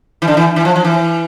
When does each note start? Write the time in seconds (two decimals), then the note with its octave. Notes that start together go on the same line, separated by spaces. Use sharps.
0.22 E3
0.28 D3
0.37 E3
0.56 E3
0.65 F3
0.76 F3
0.84 E3